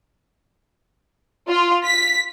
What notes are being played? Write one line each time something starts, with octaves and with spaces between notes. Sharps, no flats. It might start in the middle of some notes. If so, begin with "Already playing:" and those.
F4
B6